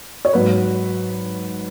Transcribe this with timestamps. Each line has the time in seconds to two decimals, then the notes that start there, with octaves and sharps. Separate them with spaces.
0.25 C#5
0.33 G#2 F#3 B4